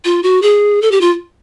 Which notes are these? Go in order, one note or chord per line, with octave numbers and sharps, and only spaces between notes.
F4
F#4
G#4
A4
G4
F4